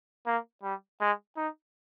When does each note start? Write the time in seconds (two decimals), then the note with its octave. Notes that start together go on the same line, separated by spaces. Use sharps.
0.26 A#3
0.63 G3
1.01 G#3
1.37 D#4